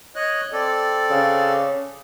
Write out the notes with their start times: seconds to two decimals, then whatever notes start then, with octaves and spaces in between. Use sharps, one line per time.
0.16 C#5 D#5 F#6
0.52 C4 A4 D5
1.11 C#3